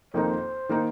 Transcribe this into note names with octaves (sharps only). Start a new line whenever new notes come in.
F2 D#3 A#3 D#4 C5
D#3 A#3 D#4